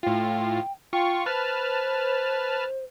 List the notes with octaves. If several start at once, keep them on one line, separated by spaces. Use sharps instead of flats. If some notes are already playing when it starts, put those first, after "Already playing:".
A2 F4 G5
F4 G5 C#6
B4 C5 A5 F6